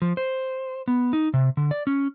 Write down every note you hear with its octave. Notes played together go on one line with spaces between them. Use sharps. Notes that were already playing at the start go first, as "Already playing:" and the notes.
F3
C5
B3
D#4
C3
D3
D5
C#4